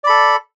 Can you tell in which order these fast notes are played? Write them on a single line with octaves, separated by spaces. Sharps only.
D5 B5 A4